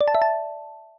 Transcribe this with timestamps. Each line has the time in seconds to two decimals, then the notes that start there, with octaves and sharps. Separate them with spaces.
0.01 D5
0.08 A5
0.15 E5
0.22 A5